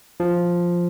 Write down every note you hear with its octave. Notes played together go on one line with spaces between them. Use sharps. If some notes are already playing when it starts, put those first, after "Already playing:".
F3